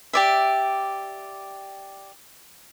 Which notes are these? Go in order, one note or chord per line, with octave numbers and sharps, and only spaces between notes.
G4 D5 E5